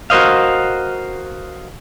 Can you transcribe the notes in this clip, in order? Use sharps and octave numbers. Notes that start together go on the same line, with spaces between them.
F#4 A#4 C5 D#5 F5